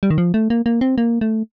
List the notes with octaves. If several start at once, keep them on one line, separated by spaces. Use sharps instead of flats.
G3
D#3
F3
A3
A#3
A#3
C4
A#3
A3